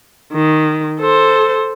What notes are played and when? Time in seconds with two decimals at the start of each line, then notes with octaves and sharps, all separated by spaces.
0.32 D#3
1.00 A4 C5